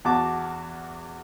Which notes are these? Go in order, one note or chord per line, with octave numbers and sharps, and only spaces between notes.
E2 F#4 A5 D6